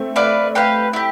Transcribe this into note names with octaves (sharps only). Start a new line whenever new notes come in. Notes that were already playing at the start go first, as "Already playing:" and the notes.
Already playing: A3 C4
E4 B4 D5 F5
G4 B4 F5
E4 G4